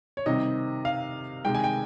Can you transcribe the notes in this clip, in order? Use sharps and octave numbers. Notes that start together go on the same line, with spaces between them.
C#5
C3 D#3 G3 C4 D#4 D#5
F5
C3 D#3 G#3 G5
G#5
G5